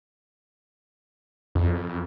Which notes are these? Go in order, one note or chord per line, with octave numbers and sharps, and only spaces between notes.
F2